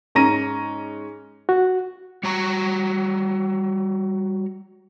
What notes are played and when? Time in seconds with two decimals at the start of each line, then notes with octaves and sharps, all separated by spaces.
0.15 G#2 C#4 A#5 A#6 D#7
1.49 F#4
2.23 G3 F#4 C#5 A#5